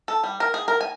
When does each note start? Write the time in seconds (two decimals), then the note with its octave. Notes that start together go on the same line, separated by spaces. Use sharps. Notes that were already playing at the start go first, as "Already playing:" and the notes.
0.08 A4
0.24 G3
0.40 A#4
0.54 G#4
0.68 A#4
0.81 G#5